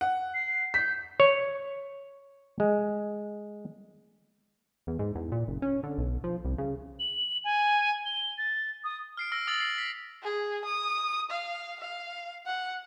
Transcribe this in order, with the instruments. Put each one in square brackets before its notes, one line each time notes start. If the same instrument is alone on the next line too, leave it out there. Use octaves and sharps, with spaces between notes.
[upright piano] F#5
[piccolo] C7
[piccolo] G6 [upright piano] B6
[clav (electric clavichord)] C#5
G#3
[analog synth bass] E2
G#2
E2
A#2
F#1
C#4
D3
B1
F3
C2
C#3
[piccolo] F#7
G#5
G7
A6
D#6
[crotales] F6 C7 D7
E6 F6 A#6 D7
D#6 E6 A6 A#6 F#7
C7
B6
[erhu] G#4
D#6
F5
F5
F#5